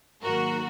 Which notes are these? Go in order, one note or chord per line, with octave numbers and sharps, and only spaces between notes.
G#2 D#3 F#3 A#3 F#4 A#4